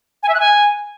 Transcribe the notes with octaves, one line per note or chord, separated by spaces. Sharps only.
G#5
E5
F#6
G#5